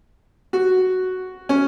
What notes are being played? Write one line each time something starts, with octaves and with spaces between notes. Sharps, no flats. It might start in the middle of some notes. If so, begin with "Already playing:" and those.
F#4
C#4